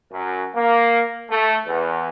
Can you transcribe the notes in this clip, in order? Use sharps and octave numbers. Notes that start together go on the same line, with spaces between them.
F#2
A#3
A3
E2